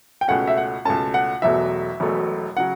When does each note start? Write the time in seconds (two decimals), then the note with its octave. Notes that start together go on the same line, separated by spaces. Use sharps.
0.21 G5
0.28 C#2 B2 A3 C#4 F#5
0.47 E5
0.57 F#5
0.85 C#2 B2 A3 C#4 A5
1.14 F#5
1.42 E1 E2 B2 F#3 A3 E5
2.00 E1 E2 B2 F#3 A3
2.57 C#3 F#3 F#5